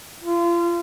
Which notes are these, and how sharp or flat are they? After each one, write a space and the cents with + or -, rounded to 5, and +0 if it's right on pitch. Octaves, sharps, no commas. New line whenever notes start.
F4 -30